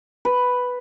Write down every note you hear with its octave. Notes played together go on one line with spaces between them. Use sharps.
B4